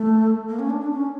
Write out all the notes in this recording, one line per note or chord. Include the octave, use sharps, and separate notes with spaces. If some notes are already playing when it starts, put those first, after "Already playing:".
Already playing: A3
A#3
C#4
D4
D4
C#4